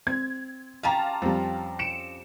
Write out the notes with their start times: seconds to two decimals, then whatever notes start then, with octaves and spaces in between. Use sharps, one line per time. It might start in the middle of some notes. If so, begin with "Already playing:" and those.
0.07 C4 G#6
0.83 C#4 F4 G4 F5 A5 A#5
1.22 F2 G3
1.79 C#7 D7 E7